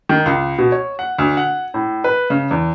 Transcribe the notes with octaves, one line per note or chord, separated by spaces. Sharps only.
D#3
C#2
B2
C#5
F#5
D2
F#5
A2
B4
C#3
E2